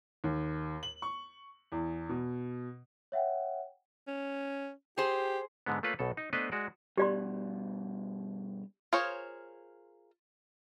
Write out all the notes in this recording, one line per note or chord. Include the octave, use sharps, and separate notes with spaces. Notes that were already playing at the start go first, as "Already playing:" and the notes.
D#2
F#7
C#6
E2
B2
C#5 E5 F#5 G5
C#4
G4 G#4 C5
G#2 D3 G#3 B3
A3 A#3 F4 B4 C#5
B1 B2 A4
D#4
A3 B3 D4 B4 C5 D#5
G#3 F#4 D5
G2 B2 G4 D5 C6
F4 G#4 A#4 C5 C#5